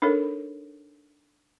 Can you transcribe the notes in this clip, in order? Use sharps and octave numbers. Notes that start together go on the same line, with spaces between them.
D4 D#4 A4 A#4 C#5